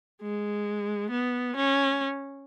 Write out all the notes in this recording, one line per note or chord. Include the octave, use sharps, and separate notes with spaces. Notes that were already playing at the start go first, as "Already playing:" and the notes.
G#3
B3
C#4